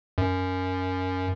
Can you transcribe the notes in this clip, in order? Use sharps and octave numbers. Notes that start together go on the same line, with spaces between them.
F#2